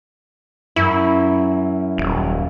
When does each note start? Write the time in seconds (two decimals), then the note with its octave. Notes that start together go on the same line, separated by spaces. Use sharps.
0.76 F#2 E4
1.98 D#1